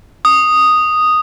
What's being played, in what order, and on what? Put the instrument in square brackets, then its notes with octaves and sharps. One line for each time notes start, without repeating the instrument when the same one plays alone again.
[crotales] D#6